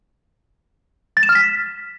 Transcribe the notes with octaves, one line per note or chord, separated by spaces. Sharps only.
A6
E7
F6
B6